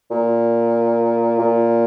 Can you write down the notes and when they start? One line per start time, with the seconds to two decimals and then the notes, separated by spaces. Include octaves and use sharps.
0.11 A#2
1.39 A#2